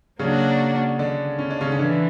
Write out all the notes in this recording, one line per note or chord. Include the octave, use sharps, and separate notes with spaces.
C#3 F#3 A#3 C#4 D4 F#4
D3 D4
C#4
D4
C#3 C#4
C#4
D3 E3 D4